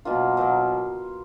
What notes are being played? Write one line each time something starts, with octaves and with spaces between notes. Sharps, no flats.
B2 F#3 A#3 F4
B2 F#3 A#3